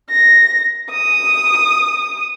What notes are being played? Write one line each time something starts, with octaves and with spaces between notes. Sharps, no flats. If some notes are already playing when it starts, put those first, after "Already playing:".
A#6
D#6